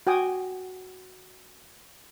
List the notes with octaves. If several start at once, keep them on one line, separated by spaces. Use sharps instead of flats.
F#4 G5 G#5 D#6